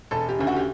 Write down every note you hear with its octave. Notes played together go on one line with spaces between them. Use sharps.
E1 A4
G4
D2 C#3
F#4
G4